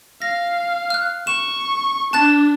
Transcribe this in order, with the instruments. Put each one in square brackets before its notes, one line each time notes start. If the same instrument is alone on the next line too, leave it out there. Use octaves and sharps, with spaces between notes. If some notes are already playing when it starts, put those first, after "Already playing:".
[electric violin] F5 [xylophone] A#6
[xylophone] F6 F#6
[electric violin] C#6 [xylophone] E7
[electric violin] D4 [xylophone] A5 F#6 A6